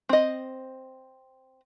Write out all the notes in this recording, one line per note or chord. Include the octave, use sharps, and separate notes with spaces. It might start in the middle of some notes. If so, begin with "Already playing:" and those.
C4 D#5